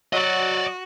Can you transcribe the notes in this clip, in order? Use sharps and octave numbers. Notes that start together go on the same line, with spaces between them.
F#3 F#4 D5 D#5